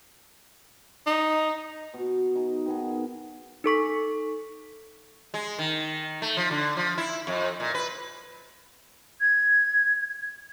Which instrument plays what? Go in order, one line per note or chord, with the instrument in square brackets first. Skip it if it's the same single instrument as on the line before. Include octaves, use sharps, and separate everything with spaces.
[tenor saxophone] D#4
[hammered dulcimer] B2
D#4 G#4
D#3 B3 G#4
[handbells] D#4 A4 C#6 B6
[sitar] G#3
D#3
A3
F3
D3
F3
E4
F2
A#2
B4
[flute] G#6